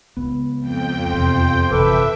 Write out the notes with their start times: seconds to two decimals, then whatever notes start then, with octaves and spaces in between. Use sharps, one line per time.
0.17 C#2 B3
0.59 F2 G5
1.11 E2 C3 C5
1.71 G1 C3 E3 A4 B4 E5 D6